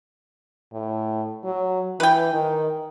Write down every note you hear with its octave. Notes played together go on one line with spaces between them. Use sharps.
A2
F#3
E3 B4 G5
D#3